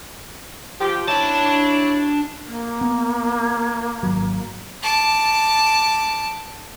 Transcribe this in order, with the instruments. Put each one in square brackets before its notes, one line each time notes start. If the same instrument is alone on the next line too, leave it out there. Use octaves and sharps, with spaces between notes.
[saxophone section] F3 G4
[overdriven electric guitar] D4 A5 [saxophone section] E4 F#4 C#5
[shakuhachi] A#3
[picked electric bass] B3
G#1 F#3
[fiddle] A5 D6